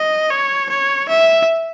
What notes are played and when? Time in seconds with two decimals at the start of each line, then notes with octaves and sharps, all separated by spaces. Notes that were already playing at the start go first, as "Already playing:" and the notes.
Already playing: D#5
0.30 C#5
0.69 C#5
1.09 E5